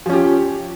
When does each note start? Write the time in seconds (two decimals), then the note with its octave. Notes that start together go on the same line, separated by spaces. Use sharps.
0.06 F3
0.09 C#4
0.13 G4